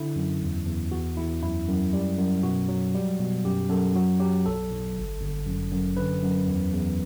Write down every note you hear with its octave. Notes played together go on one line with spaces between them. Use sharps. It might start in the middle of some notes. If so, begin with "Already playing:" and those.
Already playing: D3 E4
F#2
E2
E2
E2 F#4
E2 E4
F#2 E4
F#2
G3
F#2
B2 F#4
F#3
G3
B2
F#2 G4
F#2 A4
F#3 F#4
F#3 G4
B1 A4
B1
G1
G1
F#2
F#2
D3 B4
F#2
E2
E2